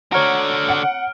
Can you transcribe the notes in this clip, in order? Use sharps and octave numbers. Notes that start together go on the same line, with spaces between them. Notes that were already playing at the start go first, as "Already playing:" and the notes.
D3 F#4 C#5 A#5 F6 D7
F#5